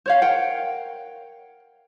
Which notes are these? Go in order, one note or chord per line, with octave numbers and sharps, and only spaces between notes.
C5 C#5 F5
A#4 F#5 G5